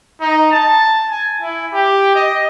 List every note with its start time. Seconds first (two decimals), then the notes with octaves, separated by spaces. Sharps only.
0.21 D#4
0.51 A5
1.10 G#5
1.42 E4
1.74 G4
2.15 D#5